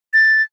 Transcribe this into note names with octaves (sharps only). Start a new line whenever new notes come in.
A6